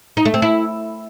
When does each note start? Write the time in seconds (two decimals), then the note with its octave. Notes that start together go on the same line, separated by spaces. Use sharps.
0.17 D#4
0.25 A3
0.34 C4
0.42 E4